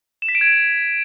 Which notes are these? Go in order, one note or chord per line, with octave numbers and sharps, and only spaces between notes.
E7
B6
D7
G#6